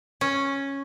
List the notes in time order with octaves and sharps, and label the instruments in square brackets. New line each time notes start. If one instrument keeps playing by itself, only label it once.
[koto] C#4